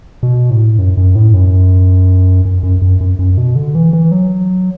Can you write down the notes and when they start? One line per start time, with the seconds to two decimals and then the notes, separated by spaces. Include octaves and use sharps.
0.23 B2
0.50 A2
0.79 F#2
0.97 F#2
1.15 A2
1.34 F#2
2.45 F#2
2.63 F#2
2.82 F#2
3.01 F#2
3.19 F#2
3.37 B2
3.55 D3
3.75 E3
3.93 E3
4.11 F#3